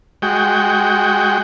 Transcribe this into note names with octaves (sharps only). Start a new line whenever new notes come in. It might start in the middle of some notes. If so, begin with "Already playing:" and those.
G#3 F#4 G5